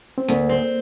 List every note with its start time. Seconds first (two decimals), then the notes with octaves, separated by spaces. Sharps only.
0.18 C4
0.28 D2 A#3
0.49 C4